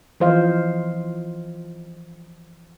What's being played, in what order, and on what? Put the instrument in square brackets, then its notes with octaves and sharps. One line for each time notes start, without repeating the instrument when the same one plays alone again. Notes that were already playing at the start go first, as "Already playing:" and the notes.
[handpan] E3 F3 C5 D#5 F5